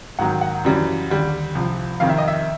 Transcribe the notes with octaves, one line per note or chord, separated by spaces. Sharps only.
G#2 D#3 F#3 F#5
F#5
F#2 C#3 E3 G3
D#2 D3 G3
C2 C3 F3
F2 C3 D#3 F5
E5
D#5
E5